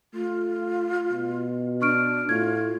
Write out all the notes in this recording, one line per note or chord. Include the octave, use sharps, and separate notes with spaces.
A3 F4
B2
D4 C#6 F6 D7
A2 F4 G#6